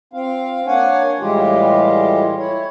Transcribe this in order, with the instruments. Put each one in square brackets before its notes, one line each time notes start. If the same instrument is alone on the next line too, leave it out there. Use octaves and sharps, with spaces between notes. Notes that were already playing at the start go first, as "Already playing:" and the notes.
[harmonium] C4 F4 F5
A#3 D4 C#5 F#5 G#5
A2 E3 G3 G#3 F4 G4
E4 C#5